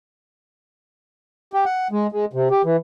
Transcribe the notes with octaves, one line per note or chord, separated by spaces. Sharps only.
G4
F#5
G#3
G#3
C3
G4
E3